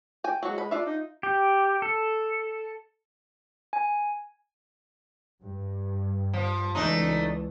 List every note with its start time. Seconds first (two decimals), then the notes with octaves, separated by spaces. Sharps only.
0.24 G5 G#5
0.43 F#3 G#3 F#4
0.58 B4 B5
0.71 D4 F4 E5
0.86 D#4
1.23 G4
1.82 A4
3.73 G#5
5.43 G2
6.33 F3
6.75 C#2 E3 A3 D4 D#4